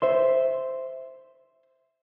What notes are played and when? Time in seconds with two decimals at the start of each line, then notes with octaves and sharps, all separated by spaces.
0.02 C5 E5 C6